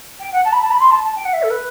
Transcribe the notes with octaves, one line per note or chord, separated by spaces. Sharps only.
G5
F#5
A5
B5
A5
B5
C6
A5
A5
G5
F#5
E5
A4
B4